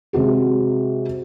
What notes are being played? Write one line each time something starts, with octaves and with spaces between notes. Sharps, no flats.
C3 G#3 F#4 G#4